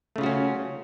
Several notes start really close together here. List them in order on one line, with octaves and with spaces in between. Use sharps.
A3 C#3 F4 F#4 C#4